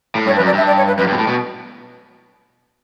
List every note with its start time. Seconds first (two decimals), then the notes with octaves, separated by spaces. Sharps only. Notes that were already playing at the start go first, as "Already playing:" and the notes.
0.15 A2
0.26 G2 C#5
0.36 B4
0.40 F#2
0.47 D5
0.53 G2 E5
0.67 D5
0.77 C#5
0.87 B4
0.98 F#2 B4
1.07 G2
1.12 B2
1.18 A2
1.27 B2